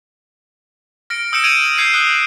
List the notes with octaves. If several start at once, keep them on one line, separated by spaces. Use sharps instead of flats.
F6 A#6 C#7 D7
D#6 E6 G6 C#7 D7 E7
G#6 D7 D#7 F7 F#7
F6 G6 G#6 C7 C#7 D#7
D#6 F#6 G6 C7 G7